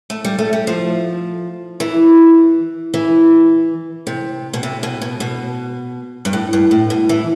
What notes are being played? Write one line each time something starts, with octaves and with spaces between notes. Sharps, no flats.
A3
G3
A3
G3
F3
E3
E3
C3
B2
C3
B2
B2
B2
G2
A2
G2
A2
B2
E3